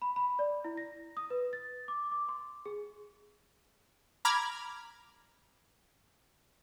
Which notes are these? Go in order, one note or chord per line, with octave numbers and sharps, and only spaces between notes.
B5
B5
D5
E4
A#6
D#6
B4
A6
D6
D6
C6
G#4
A#5 B5 D6 F6 G#6